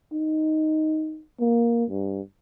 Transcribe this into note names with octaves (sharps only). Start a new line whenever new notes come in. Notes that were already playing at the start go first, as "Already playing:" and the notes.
D#4
A#3
G2